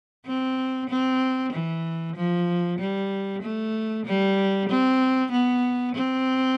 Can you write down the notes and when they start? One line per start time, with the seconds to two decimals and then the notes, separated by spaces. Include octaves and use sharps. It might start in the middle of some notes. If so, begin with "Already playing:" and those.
0.26 C4
0.89 C4
1.53 E3
2.16 F3
2.79 G3
3.43 A3
4.06 G3
4.69 C4
5.32 B3
5.95 C4